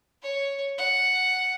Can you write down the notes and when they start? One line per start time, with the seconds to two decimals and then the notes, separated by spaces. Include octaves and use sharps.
0.22 C#5
0.78 F#5